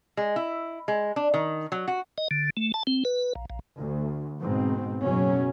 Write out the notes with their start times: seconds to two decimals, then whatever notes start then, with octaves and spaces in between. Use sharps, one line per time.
0.17 G#3
0.36 E4
0.88 G#3
1.16 D4
1.34 D#3
1.72 F#3
1.88 F#4
2.18 D#5
2.31 D3
2.57 A3
2.74 A5
2.87 C4
3.05 B4
3.35 A#1
3.50 A#1
3.78 D2
4.40 G#2 B2 C4
5.00 F#1 B2 F#3 C#4